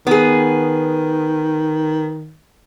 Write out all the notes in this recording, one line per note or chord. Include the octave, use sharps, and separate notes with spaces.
D#3 B3 G#4